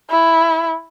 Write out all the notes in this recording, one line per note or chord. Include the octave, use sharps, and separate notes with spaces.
E4